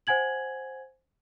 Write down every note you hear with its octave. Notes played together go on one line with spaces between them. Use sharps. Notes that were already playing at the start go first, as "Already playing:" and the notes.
C5 F#5 G#5 G#6 F#7